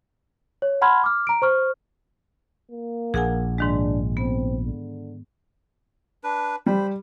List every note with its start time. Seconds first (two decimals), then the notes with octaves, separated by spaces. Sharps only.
0.62 C#5
0.81 F#5 A5 B5 C6 F6 G#6
1.04 D6 F6
1.27 A#5 D7
1.42 C5 C#6 F6
2.71 A#3
3.14 A#1 G#4 F#5 G#5
3.58 G#2 D#3 G#3 D4
4.17 B3 C4
4.66 D3
6.24 D4 B4
6.66 G3 C5 B5